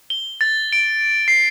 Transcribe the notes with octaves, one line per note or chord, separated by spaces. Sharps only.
G7
A6
D7
C7